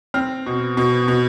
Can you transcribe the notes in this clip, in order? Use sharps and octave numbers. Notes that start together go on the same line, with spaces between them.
C4 F6
B2
B2
B2